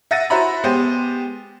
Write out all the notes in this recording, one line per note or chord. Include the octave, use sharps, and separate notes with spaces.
E5 F#5 A6 A#6 D#7
E4 F#4 C5 E5 A#5 B5
G#3 B3 G4 C5